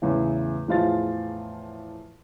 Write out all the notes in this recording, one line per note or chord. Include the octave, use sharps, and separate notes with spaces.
E2 A2 C#3 E3
E2 A2 F3 F4 G#4 A6